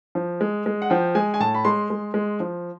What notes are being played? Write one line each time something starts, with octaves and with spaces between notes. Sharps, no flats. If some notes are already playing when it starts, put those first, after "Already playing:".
F3
G#3
G#3
F#5
F3 G5
G#3 G#5
G#5
A2 A5
B5
G#3 C6
G#3
G#3
F3